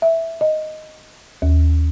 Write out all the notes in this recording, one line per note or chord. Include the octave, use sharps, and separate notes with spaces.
E5
D#5
D#2